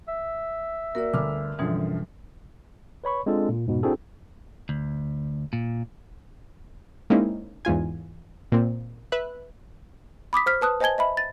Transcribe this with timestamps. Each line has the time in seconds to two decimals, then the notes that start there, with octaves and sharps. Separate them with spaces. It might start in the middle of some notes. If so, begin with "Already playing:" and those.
0.08 E5
0.95 A#3 F#4 A#4 D5
1.14 G1 D2 D6 E6 F6
1.58 F#2 B2 D3 E3 F3 G3
3.04 B4 C#5 B5 C#6
3.26 G#3 C4 D4 F4 A4
3.49 A#2
3.66 F2 G#2 B2
3.83 C4 D4 E4 F#4 G#4 A4
4.69 D2
5.53 A#2
7.10 G#3 A#3 C4 C#4 D#4 E4
7.65 E2 G#2 F4 G#5
8.52 A#2 A#3 C4
9.12 B4 E5 F#6
10.33 B5 D6 D#6 B6
10.46 C5 F6 B6
10.61 B4 A5 D#6 F#6
10.80 C5 D#5 G#5 A5 G#6 G7
10.98 D#5 E5 B5
11.17 A6